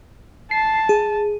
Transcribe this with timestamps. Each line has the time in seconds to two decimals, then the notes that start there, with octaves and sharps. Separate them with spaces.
0.51 A5 C7
0.89 G#4